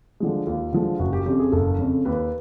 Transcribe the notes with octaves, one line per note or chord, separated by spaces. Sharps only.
D3 F3 G#3
D#2 F4
D3 F3 G#3
F#1 F#4
G4
F2 C#3 G4
G#4
F#1 A4
F2 C#3
D#2 B4